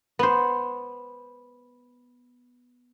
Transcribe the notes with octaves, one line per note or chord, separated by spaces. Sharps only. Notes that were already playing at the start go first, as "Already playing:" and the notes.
B3 C5